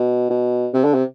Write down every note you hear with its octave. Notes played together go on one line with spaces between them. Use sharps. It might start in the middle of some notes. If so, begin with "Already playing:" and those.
Already playing: B2
B2
C3
D3
C3